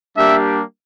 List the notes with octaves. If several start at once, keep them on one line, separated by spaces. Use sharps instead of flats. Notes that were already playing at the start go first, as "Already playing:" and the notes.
G3 A#3 D4 G4 E5